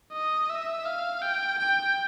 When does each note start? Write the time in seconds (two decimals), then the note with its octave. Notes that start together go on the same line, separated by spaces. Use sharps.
0.13 D#5
0.49 E5
0.86 F5
1.22 G5
1.59 G5